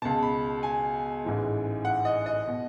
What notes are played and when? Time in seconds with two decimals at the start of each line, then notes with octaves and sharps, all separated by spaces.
0.02 C#2 B2 A5
0.23 B5
0.63 G#5
1.24 A1 G#2 E3
1.85 F#5
2.05 D#5
2.26 D#5
2.48 B2